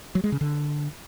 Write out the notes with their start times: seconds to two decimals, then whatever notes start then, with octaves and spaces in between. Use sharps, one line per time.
0.15 F#3
0.24 G#3
0.32 C#3
0.41 D3